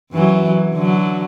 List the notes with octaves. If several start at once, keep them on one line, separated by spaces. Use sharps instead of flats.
F#2 E3 F#3
D3 F#3